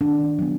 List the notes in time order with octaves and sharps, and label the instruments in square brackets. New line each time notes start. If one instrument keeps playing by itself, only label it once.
[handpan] D#3 D4
F#3 B3